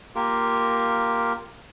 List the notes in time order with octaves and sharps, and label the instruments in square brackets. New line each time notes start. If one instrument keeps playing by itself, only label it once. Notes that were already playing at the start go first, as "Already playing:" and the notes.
[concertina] A#3 F4 G4 A#4